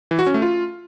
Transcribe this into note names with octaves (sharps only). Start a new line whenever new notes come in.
E3
F#4
C#4
A3
F4